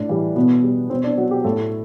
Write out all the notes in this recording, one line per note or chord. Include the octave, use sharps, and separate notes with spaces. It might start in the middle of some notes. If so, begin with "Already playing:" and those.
Already playing: A2 D4
E3 G3
B2 B3
G3
B2 C4
D4
F#3 F#4
G4
A2 A4